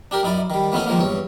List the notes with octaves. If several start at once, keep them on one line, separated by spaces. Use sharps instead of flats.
D4 G4 A#4
F#2 D#4 E4 D5
D#3 G3
E3 A3 B3 C#4 D#4 E4
D#3 F3 G#3 A#3
E2 G2 C#5